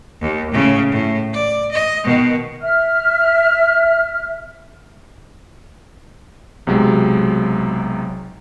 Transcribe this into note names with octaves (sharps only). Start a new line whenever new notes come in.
D#2
A2 C#3
A2
D5
D#5
B2 D#3
E5 F6
B1 C3 F#3 G#3